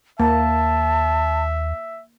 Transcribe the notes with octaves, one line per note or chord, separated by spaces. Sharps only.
D#2 A#3 E5 A5